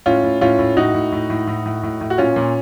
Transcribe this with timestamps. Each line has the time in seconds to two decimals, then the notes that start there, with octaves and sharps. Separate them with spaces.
0.06 A2 C#4 F4
0.24 A2
0.41 A2 C#4 F4
0.59 A2
0.77 A2 D#4 F#4
0.94 A2
1.12 A2
1.30 A2
1.47 A2
1.66 A2
1.83 A2
2.01 A2
2.10 F#4
2.18 A#2 C#4 F4
2.36 A#2